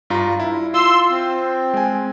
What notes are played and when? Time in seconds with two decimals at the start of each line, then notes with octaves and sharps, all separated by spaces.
0.10 G2 F4 A#5
0.40 E4
0.74 F4 C6 E6
1.11 C4
1.74 G#3 G#5